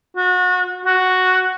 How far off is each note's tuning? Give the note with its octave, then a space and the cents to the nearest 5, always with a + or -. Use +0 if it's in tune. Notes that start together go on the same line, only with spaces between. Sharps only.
F#4 -30
F#4 +0